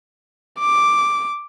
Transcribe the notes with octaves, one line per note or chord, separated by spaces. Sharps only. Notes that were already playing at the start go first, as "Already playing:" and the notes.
D6